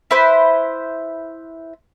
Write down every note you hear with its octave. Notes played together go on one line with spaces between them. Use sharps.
E4 B4 C5